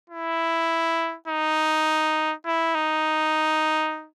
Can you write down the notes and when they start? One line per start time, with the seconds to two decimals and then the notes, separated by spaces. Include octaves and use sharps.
0.10 E4
1.28 D#4
2.46 E4
2.75 D#4